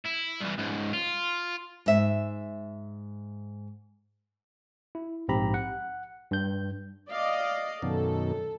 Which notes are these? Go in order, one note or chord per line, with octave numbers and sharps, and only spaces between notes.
E4
G2 E3
C#2 G#2
F4
G#2 E5
E4
A#1 G#2 C4 G4 A#5 B5
F#5
G2 G6
D5 D#5 F5
F#2 B2 D#3 A4